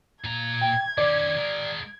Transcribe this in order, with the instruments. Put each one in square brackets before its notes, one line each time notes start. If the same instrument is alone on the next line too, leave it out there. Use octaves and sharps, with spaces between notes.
[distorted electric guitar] A#2 A#5 [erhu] G#6
[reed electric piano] G5
[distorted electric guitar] D#3 C#4 [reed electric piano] D5
[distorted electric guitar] G#3 A#4